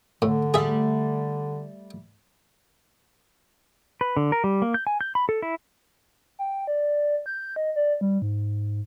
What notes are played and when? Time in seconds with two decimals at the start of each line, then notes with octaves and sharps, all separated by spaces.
0.22 A2 D3
0.54 G3 A3 G#4 E5
4.01 B4
4.17 D3
4.32 A#4
4.44 G3
4.62 A#3
4.74 G6
4.87 G#5
5.01 G6
5.15 B5
5.29 A4
5.42 E4
6.39 G5
6.67 D5
7.26 G6
7.56 D#5
7.76 D5
8.01 G3
8.22 G#2